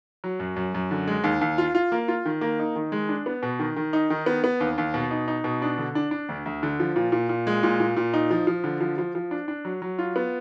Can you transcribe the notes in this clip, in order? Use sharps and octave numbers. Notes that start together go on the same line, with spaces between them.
F#3
F#2
F#2
F#2
D3
G#3
D#2
D#2
F4
F4
A#3
F4
D#3
A#3
D#4
D#3
G#3
D4
B3
B2
D#3
D#3
D#4
D#3
B3
B3
D#2
D#2
B2
D#4
D#4
B2
D4
D3
D4
D4
D2
D2
D3
F3
A#2
A#2
A#2
G#3
A#2
A#2
A#2
D#4
F3
F3
D3
F3
F3
F3
D4
D4
F#3
F#3
F4
B3